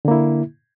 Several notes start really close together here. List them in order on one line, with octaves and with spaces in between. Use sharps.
D3 A#3 E4